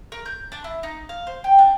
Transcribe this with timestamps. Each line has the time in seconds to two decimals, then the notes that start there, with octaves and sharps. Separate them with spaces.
0.12 A#4
0.26 G6
0.52 D4
0.64 E4
0.83 D#4
1.09 F5
1.27 C5
1.44 G5
1.59 D4